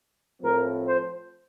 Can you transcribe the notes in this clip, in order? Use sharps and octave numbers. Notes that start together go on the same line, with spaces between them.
A2 F3 C4 A#4
C5